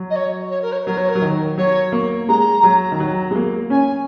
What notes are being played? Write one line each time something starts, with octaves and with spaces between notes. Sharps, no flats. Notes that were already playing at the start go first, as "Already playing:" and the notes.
Already playing: F#3
D#5
C#5
C#5
A#4
C#5
F#3 A#4
C#5
A#4
F#3
D#3
F#3 C#5
A#3
G#3 A#5
F#3
D#3
F#3
G#3
A#3
C#4 G#5